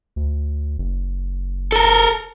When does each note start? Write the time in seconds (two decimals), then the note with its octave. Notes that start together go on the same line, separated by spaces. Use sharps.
0.16 D2
0.78 F#1
1.72 A4 A#4